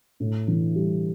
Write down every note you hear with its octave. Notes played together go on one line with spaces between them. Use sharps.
A2
E3
G3